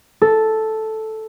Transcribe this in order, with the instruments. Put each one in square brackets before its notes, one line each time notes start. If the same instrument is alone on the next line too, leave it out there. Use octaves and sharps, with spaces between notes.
[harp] A4